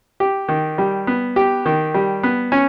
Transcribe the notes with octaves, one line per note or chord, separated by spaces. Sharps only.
G4
D#3
G3
B3
G4
D#3
G3
B3
C#4